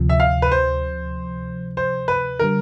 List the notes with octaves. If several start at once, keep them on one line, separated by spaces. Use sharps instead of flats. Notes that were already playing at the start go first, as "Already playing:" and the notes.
Already playing: D2 C3 F3
E5
F5
B4
C5
C5
B4
D3 G3 A#4